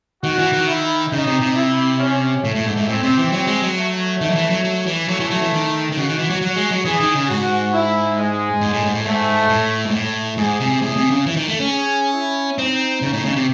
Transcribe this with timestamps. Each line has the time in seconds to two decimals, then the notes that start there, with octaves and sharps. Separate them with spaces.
0.23 D#3 F#4
0.38 E3
0.53 D#3
0.67 E4
1.12 C#3 D#4
1.27 C3
1.41 C3
1.56 E4
1.99 C#4
2.44 A2 A3
2.55 A2
2.66 G#2
2.77 G#2
2.88 A2 C4
3.03 C3
3.18 E3
3.32 F#3
3.47 G#3
3.62 F#3
3.77 A3
4.21 D#3
4.30 F#3
4.35 E3
4.50 F#3
4.64 F#3
4.86 E3
5.08 F#3 A3
5.20 E3
5.30 F#3
5.42 E3
5.53 D#3
5.92 D#3
5.97 C#3 F#4
6.08 D#3
6.19 E3
6.30 F#3
6.42 F#3
6.56 G#3
6.71 F#3
6.85 E3 G#4
7.00 D#3
7.15 C#3
7.29 G#2 F#4
7.73 E4
8.17 G#3
8.61 G#2
8.73 A2
8.83 G#2
8.94 A2
9.06 G#2 A3
9.49 A2
9.85 G#2
9.93 A2
10.38 G#2 G#4
10.60 C3
10.81 A2 G#4
10.97 C3
11.11 C#3
11.26 E3
11.36 D#3
11.48 A3
11.59 C#4
11.70 G#4
12.14 E4
12.58 C4 D#4
13.02 C#3
13.13 A2
13.25 C#3
13.36 C3